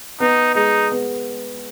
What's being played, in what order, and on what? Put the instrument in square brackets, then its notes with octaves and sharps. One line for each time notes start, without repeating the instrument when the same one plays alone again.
[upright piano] B3 [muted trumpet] D#4
[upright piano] G#3 [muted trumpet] D#4
[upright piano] B3